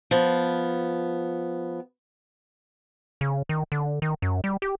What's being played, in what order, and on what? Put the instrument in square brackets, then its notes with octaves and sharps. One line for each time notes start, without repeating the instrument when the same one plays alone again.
[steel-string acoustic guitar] F3 B3
[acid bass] C#3
D#3
D3
D#3
F#2
G3
G4